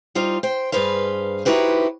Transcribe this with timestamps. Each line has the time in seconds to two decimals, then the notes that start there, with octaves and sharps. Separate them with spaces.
0.15 G3 D#4 F4 C5
0.43 C5 G5
0.72 G2 D#3 G#4 B4 C5 F5
1.45 D#4 E4 F#4 G4 B4 C5